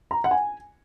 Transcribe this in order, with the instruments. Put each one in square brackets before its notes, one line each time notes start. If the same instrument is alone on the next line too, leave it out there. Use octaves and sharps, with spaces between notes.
[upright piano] A#5
F#5
G#5